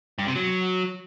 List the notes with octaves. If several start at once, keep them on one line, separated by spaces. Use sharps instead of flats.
G2
C3
F#3